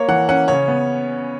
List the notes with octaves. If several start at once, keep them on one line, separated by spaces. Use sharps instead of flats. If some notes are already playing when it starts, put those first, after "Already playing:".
Already playing: A#3 C#5
E3 F#5
C#4 F#5
C#3 C#5
B3